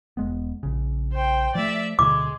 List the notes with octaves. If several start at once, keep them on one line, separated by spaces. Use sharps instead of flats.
E1 G#3 B3
A#1 C#3
C5 G5
F3 F#3 A3 D5 E5
D2 B2 D3 G#3 D6